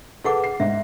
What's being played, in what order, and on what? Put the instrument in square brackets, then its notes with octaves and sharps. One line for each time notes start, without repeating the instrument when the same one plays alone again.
[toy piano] G#4 F#5 D6 [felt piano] A4 B4
[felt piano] C7
[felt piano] G#2 [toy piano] E5